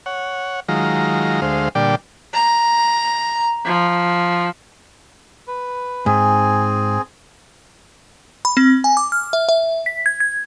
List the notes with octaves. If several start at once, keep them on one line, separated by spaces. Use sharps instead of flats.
C#5 F#5
D#3 F#3 G#3 F4 A#5
D2 G#3 C5 F5
A#2 D3 G3 D5 G5
A#5
F3
B4
G#2 C4 G#4 G#5
B5
C4
G#5
D6
F6
E5
E5
B6
G#6
G#6